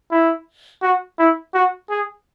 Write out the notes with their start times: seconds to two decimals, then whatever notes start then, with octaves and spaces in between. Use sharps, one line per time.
0.11 E4
0.82 F#4
1.19 E4
1.54 F#4
1.90 G#4